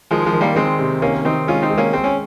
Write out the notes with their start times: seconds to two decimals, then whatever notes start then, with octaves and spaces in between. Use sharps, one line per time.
0.11 D#3 F3 G#3
0.26 F3 G#3
0.33 D#3
0.41 G3 A#3
0.56 D#3 G#3 C4
0.79 C3
1.01 D#3 A#3 C#4
1.25 D#3 C4 D#4
1.47 G#3 C#4 F4
1.62 C4 D#4
1.71 G#3
1.78 A#3 C#4
1.93 G#3 C4
2.04 C#4